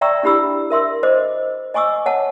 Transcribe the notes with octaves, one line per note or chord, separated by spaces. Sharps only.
D5 E5 G5 A#5 C#6 E6
D4 E4 G4 B5 E6
A#4 E5 C6 E6
C5 D#5 D6
D#5 G#5 C#6 D6 E6
C#5 F#5 A5